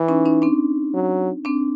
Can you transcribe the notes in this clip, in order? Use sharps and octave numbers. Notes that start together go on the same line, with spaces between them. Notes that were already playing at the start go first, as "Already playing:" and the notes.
Already playing: E3
C#4 D#4
C#4 D#4
C4 D4
F#3
C4 D4